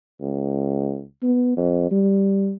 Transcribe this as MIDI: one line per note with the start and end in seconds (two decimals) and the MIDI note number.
0.21 1.03 37
1.22 1.53 59
1.57 1.86 41
1.91 2.53 55